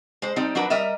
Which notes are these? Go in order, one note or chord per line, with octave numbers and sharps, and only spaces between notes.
G#3 C5
G3 C4 D#4
F#3 D4 F#4 A#4 B4
G3 A#4 D#5 E5